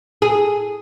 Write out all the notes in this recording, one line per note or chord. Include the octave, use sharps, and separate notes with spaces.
G#4